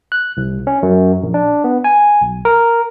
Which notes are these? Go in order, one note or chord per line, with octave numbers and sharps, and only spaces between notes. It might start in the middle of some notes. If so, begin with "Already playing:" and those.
F#6
C2
C#4
F#2
A#1
D4
B3
G#5
B1
A#4